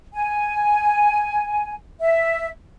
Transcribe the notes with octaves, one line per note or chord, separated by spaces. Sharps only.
G#5
E5